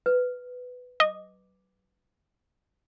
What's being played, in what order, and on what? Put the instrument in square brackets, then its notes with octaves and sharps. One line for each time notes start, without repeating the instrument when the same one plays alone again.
[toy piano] B4
[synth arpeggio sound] D#5 [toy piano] D6